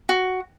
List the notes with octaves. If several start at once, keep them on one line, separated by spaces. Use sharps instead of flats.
F#4